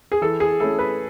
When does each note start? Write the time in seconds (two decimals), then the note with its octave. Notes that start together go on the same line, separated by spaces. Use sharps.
0.12 G#4
0.22 E3 A4
0.40 G#4
0.60 A3 C#4 E4 A4
0.79 B4